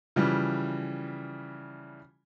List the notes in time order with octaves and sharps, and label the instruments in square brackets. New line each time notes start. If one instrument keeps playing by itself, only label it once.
[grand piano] C#3 E3 F3 G3